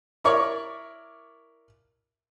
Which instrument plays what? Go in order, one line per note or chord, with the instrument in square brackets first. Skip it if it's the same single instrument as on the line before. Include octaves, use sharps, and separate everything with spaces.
[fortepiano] E4 A#4 C#5 D5 C#6